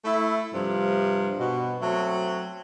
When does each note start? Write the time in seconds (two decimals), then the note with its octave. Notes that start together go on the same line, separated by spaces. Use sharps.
0.05 A3 E4
0.53 G2 C3 F3
1.39 B2
1.81 F#3 A3 C4